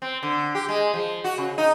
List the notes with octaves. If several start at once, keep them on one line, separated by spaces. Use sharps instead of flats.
C4
D3
G4
G#3
F3
F#4
C#3
D#4